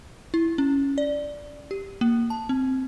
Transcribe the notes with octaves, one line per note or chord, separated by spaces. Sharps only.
E4
C#4
D5
G4
A#3
A5
C4